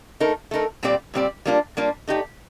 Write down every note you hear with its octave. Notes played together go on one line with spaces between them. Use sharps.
A3 D#4 A#4
A3 D#4 A#4
A#2 G3 C4 G4 D5
A#2 G3 C4 G4 D5
G3 A#3 D4 F4
G3 A#3 D4 F4
A3 D#4 G4 D5